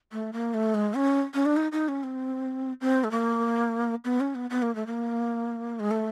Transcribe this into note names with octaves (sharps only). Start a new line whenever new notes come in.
A3
A#3
A3
G#3
C#4
C#4
D4
D#4
D#4
C#4
C4
C4
A3
A#3
B3
C#4
B3
B3
A#3
A3
A#3
G#3
A3